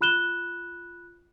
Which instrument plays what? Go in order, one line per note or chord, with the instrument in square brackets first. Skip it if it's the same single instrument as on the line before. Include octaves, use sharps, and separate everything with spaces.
[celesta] F4 B5 F#6 E7 G7